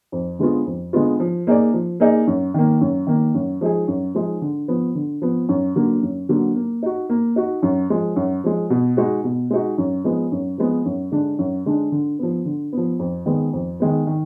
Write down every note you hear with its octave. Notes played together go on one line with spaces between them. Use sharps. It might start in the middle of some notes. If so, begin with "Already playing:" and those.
F2
D3 G#3 B3 F4
F2
D3 G#3 B3 F4
F3
A#3 D#4 G#4 D5
F3
A#3 D#4 G#4 D5
F#2
D#3 A#3
F#2
D#3 A#3
F#2
F3 G#3 D#4 G#4
F#2
F3 G#3 D#4 G#4
D3
F3 B3
D3
F3 B3
F#2
D3 F#3 A#3
F#2
D3 F#3 A#3
A#3
D#4 F#4
A#3
D#4 F#4
F#2
F3 G#3
F#2
F3 G#3
B2
G#3 D#4 F#4
B2
G#3 D#4 F#4
F#2
F3 G#3 B3
F#2
F3 G#3 B3
F#2
D3 G#3 D4
F#2
D3 G#3 D4
D3
F3 B3
D3
F3 B3
F2
D#3 G#3 B3
F2
D#3 G#3 B3
D#3